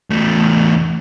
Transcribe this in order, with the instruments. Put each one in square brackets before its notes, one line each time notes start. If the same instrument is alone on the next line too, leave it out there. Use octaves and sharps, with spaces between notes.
[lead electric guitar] E2 A3